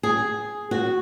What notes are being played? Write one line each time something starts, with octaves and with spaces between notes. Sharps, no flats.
G#4
F#4